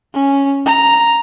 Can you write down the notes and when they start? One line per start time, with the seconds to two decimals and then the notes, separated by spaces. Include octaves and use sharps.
0.14 C#4
0.66 A#5